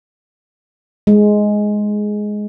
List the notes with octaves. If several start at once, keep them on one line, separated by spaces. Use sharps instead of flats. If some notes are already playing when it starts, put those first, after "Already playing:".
G#3